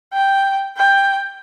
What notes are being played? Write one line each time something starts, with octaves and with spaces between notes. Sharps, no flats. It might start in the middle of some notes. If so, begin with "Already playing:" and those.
G5
G5